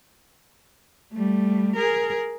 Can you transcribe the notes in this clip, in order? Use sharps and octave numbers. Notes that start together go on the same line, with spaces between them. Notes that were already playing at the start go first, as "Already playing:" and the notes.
G3 A3
G#4 A#4